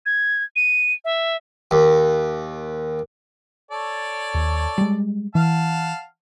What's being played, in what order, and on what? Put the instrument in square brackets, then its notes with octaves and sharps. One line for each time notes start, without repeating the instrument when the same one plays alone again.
[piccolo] G#6
D#7
E5
[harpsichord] D#2
[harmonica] A4 C#5 D5
[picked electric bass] D#2
G3 G#3
[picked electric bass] E3 [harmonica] F5 F#5 A5